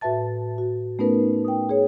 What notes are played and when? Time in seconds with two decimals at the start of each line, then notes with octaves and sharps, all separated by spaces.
0.01 A2 F#4 B4 E5 A5 A6
0.58 F#4
0.99 A3 B3 C#4 D#4 A#4 B4
1.45 G5 D#6
1.69 G#4 C#5 G5